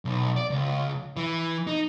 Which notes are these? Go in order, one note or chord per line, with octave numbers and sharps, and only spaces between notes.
B1
D5
C#2
E3
D#4